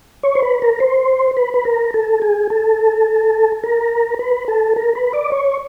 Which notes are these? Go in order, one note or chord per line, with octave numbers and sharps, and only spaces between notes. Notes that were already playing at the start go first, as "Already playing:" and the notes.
C#5
C5
B4
A#4
C5
B4
B4
A#4
A4
G#4
A4
A#4
B4
A4
A#4
B4
D5
C#5